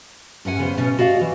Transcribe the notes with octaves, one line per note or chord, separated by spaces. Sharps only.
G2 C#4 F#5 G#5
C#3 B3 C5
B2 C#4
F#4 D5 D#5 F5
E3